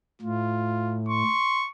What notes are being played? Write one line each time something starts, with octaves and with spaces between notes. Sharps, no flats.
A2 F4
C6 C#6